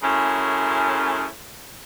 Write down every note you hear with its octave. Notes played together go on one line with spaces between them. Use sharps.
F#2 C#3 G#3 A3 C#4 E4